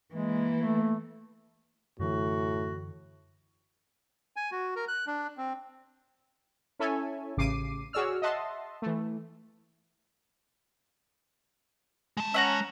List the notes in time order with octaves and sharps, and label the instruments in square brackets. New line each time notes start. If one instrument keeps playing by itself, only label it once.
[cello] E3 A#3 [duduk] G#3
[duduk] A3
[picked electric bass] F#2 D3 E3 [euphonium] A2 [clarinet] F#4
[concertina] G#5
F#4
A#4
F#6
D4
C4
[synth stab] C#4 E4 A4 C#5 E5 G#5
A1 C#3 D6 C7 D#7
F#4 G#4 C#5 D5 E6 F6
D#5 E5 F#5 A5 C6
E3 A3
[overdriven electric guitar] G#3 A5
[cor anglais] C#4 [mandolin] E5 F#5 A#5